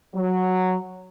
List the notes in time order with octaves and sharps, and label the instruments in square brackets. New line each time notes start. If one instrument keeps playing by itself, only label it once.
[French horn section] F#3